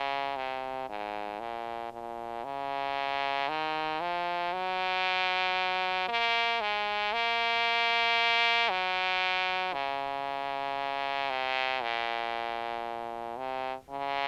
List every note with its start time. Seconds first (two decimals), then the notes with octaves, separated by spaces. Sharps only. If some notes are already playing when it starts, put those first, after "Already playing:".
Already playing: C#3
0.36 C3
0.89 G#2
1.40 A#2
1.92 A#2
2.44 C#3
3.49 D#3
4.01 F3
4.53 F#3
6.08 A#3
6.61 G#3
7.13 A#3
8.69 F#3
9.73 C#3
11.30 C3
11.82 A#2
13.38 C3
13.90 C#3